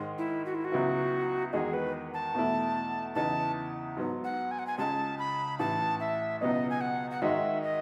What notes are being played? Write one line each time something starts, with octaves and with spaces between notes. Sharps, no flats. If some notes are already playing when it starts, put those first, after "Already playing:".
Already playing: G#2 D#3 G#3
E4
F#4
E4
F#4
C#2 C#3 F#3 B3 E4
E2 D#3 G#3 D#4 F#4 G#4
B4
A5
E2 B2 A3 E4
E2 C#3 E3 B3 D#4 A5
G#2 F#3 B3
F#5
G#5
F#5
G#5
C#2 C#3 G#3 A5
B5
A1 A2 E3 A5
E5
C#2 B2 F#3 B3 D#4 D#5
G#5
F#5
F#5
G#2 D#3 G#3 D#4 F#4 E5
D#5